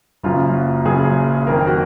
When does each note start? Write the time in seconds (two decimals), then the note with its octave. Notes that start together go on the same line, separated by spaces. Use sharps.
0.23 F#1 F#2 C#3 F4
0.54 F#4
0.85 F#1 F#2 C#3 G#4
1.47 F#1 F2 D#3 A#4
1.67 F#4